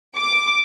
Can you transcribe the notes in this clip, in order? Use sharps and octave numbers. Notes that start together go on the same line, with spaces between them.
D6